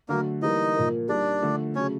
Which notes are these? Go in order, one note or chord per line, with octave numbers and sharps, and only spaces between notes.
D3 F#3 A3 A#3 A#4
E3 G3 A#3 D#4 D#5
A#2 F3 A#3
G3 A#3 D4 D#4 D5
D3 F3 A3
C#3 F#3 A3 C#4 C#5